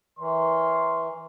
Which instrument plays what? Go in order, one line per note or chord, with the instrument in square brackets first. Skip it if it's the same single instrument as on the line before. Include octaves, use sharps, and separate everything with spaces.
[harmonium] E3 [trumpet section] A#4 C#5 C6